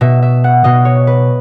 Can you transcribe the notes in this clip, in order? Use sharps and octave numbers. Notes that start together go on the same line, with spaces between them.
B2 E5
E5
F#5
B2 D#5
C#5
B4